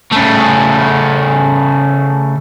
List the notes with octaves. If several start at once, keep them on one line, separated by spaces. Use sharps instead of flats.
C#3 A3